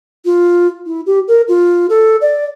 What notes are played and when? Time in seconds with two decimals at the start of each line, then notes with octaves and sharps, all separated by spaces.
0.25 F4
0.86 E4
1.06 G4
1.28 A#4
1.48 F4
1.89 A4
2.21 D5